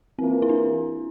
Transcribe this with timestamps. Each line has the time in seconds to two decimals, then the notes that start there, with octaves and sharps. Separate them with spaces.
0.18 E3 A#3 C4 F4 A#4
0.42 E4
0.49 D4